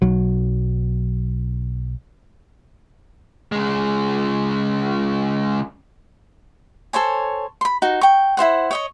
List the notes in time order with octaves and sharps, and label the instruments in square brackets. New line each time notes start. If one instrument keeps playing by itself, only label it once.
[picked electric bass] B1 F#3
[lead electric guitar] C#3 G#3
[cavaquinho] A4 C5 C#5 G#5
B5 C6
D#4 F#4
G5 C#6
E4 F4 C5 F#5
C#5 D#5 C#6